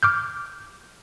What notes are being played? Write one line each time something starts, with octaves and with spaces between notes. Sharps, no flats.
D6 F6 G6